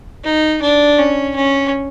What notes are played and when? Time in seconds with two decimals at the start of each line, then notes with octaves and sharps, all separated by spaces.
0.24 D#4
0.62 D4
0.98 C#4
1.36 C#4